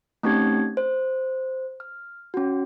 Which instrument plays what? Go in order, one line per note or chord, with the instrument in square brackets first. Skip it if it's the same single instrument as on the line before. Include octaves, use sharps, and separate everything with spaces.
[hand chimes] A3 C4 C#4 D#4 G4 G#6
C5
F6
C#4 F#4